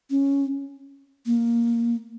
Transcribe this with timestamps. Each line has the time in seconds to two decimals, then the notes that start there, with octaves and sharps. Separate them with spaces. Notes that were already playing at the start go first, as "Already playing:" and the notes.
0.10 C#4
1.26 A#3